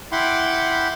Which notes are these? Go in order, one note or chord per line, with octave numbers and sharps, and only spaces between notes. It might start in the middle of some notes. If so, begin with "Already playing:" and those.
E4 F#5 G5 B5 C6 D6